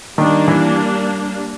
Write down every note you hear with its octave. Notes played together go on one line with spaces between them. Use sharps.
D#3 G3 A#3 D4
E3